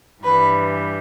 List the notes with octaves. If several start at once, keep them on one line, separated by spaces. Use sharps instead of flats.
G2 E3 G3 B4